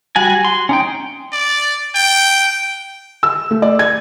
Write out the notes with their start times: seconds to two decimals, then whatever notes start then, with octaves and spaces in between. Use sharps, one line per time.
0.16 G3 F#4 G#5
0.45 C6
0.69 C#4 D#4 G5
1.32 D5
1.95 G5
3.23 E6
3.51 A3
3.62 D5
3.79 G#6